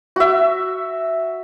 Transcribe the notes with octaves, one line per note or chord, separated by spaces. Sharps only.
F#4 E5